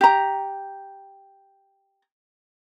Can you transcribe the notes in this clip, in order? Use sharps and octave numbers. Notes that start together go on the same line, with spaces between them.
G4 A#5